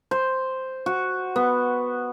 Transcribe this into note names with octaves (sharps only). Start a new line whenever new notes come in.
C5
F#4
B3